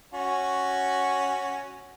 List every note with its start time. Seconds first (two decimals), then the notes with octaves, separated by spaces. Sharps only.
0.14 C#4 F#4